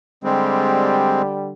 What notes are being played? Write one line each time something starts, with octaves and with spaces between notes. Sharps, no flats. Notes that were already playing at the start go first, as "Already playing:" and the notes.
D3 G3 G#3 C4